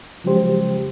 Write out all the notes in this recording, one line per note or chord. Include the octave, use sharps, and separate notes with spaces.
C#3 F3 F#3 G#3 G4 C5